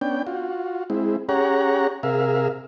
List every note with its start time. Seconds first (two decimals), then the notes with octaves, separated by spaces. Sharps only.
0.01 B3 C#4 D4 G5
0.27 F4 F#4
0.90 G#3 C4 E4
1.29 C#4 G4 G#4 C#5 F#5 A#5
2.03 C3 G#4 A#4 E5 F5